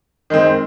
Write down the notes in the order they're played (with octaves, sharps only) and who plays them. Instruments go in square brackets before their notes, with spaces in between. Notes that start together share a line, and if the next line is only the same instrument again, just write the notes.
[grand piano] D#3 G#3 C4